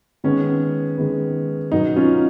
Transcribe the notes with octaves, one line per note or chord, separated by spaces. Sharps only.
D#3 G#3 B3 C#4
D#3 G#3 B3
B2 F#3 B3 D#4
C#4 F4